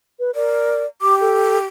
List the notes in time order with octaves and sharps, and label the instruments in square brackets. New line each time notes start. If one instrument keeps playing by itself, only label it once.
[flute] B4
[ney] A#4 [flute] D5
[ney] G4 [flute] D6
[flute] A4